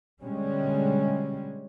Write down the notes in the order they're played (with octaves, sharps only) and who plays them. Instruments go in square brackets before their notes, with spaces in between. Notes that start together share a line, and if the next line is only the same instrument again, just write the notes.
[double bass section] B2 D3 G3 G#3 C#4